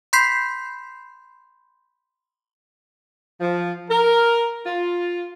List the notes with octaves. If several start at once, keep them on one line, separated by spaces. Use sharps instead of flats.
B5 C6 G6 B6 C7
F3
A#4
F4